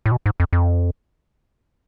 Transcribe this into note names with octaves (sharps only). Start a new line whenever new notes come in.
A2
B2
G#2
F2
F2